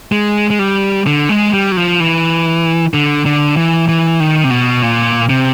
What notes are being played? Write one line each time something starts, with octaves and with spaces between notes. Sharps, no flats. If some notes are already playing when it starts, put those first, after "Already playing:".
G#3
G#3
G3
D3
G#3
G3
F#3
F3
E3
D3
D3
E3
E3
D#3
C3
B2
A#2
C3